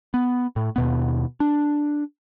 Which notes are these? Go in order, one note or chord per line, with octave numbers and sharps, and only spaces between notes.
B3
A2
D#2 B2 B3
D4